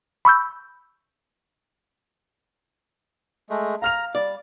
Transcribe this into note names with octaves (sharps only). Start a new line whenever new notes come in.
B5 C#6 E6 G6
G#3 A3
F5 A#5 F6 F7
G3 D5